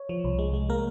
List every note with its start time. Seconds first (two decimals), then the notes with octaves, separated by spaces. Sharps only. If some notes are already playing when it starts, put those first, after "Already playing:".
Already playing: C#5
0.09 F3
0.24 C2
0.39 G#3
0.54 G#3
0.70 A#3 A#4